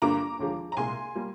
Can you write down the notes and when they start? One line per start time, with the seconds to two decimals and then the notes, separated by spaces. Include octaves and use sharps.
0.02 G2 D3 G3 A#3 A#5 D6
0.39 D#2 D3 F3 G#3
0.72 A#5
0.77 C2 A#2 G#3 G#5 C6
1.15 G3 A#3